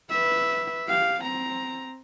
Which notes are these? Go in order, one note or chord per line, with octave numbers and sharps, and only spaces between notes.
B4 E5
G4 F5
C4 A#5